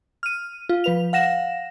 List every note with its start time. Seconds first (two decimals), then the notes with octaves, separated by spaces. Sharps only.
0.23 F6 D#7
0.69 F4
0.84 F3 B4 F7
1.13 F5 F#5 A#6 E7